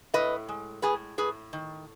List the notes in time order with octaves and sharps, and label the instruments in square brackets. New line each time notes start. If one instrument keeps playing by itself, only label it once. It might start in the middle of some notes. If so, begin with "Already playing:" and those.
[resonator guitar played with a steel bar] A2 B4 D#5
G#3
A2 G#4 B4
A2 G#4 B4
D#3